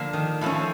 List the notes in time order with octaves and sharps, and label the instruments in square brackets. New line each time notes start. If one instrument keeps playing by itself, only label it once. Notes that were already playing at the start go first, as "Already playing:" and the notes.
Already playing: [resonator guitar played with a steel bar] D3 F3 A#3 D4
[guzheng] D#3
[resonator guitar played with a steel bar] A2 F3 A3 C#4